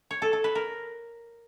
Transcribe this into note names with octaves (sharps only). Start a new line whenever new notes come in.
C#5
A4
A4
B4
A#4